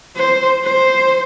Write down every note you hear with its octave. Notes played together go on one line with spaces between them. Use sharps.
C5
C5